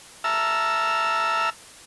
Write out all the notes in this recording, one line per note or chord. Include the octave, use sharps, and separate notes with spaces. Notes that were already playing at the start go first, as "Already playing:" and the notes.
E5 A5 A#5 E6 F6